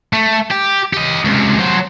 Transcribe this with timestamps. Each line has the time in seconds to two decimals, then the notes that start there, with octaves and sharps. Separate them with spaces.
0.13 A3
0.51 G4
0.93 G4 D#5
1.25 C#2 C3
1.59 F#3 C5